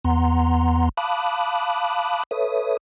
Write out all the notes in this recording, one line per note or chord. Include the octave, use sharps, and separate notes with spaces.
E2 B3 F#5 A#5 C6
F5 A5 B5 D6 D#6 F#6
A4 B4 C#5 E5 D#6